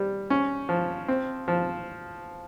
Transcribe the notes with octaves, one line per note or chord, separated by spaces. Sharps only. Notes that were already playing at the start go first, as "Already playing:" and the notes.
Already playing: G3
C#4
F3
C4
F3